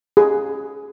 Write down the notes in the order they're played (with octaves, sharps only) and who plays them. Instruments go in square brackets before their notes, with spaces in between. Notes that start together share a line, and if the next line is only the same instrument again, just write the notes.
[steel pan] G#4